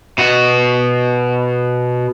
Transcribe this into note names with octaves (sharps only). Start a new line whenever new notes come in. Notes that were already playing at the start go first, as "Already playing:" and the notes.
B2 F#4